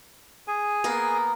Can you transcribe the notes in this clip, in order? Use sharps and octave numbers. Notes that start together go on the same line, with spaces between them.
G#4 G#5
A#3 B3 A#4